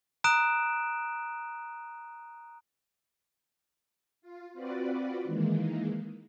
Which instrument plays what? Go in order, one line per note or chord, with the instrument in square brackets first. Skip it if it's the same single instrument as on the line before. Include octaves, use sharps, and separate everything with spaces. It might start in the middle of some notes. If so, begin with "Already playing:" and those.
[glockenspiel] A#5 D#6 F#6 D7 E7
[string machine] F4
C4 F4 F#4 B4 D5
D#3 E3 G#3 A#3